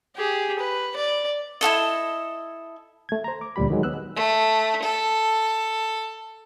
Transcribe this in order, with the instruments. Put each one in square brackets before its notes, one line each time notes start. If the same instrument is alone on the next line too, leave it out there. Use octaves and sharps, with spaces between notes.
[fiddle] G4 G#4
B4
D5
[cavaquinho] E4 F4 A4 D#5
[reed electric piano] A3 G#6
C5 A#5
D6
D2 A#2 G3 G4 B5
D#3 F#3 G#3
B3 E6 F#6
[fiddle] A3
A4